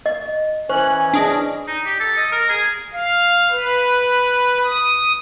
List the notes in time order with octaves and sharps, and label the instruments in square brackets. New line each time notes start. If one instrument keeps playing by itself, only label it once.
[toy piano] D#5
[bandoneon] E3 C#4 [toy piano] C5 C#6 [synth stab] F#6
[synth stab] D4 G#4 D#5
[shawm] D#4
G4
A4
D#5
A#4
G#4
[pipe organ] F5
B4
D#6